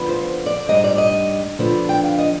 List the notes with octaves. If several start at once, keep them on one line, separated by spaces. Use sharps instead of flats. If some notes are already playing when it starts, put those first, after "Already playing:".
Already playing: D3 F3 B3
C5
D5
G#2 G3 D4 D#5
D5
D#5
D3 F3 B3 D4
G5
F5
D#5